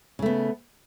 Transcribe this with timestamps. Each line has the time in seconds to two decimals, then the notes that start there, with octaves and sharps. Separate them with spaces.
0.19 C#3
0.22 A3
0.26 B3